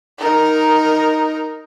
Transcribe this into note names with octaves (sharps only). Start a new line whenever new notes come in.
D#4 A#4